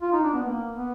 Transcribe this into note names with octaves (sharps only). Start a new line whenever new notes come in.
F4
D#4
D4
B3
A#3
B3